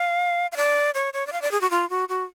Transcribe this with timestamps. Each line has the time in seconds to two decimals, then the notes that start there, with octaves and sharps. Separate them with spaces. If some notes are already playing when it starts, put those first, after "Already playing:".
Already playing: F5
0.52 F5
0.56 D5
0.94 C#5
1.13 C#5
1.27 D5
1.32 F5
1.42 D5
1.51 G#4
1.61 F#4
1.70 F4
1.90 F#4
2.09 F#4